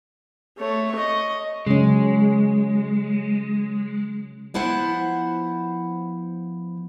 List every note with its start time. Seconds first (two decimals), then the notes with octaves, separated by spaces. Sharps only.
0.58 A3 C#5
0.92 D#5 C#6
1.67 C#3 F#3 G#3 C#4
4.54 F3 B3 E4 C5 F#5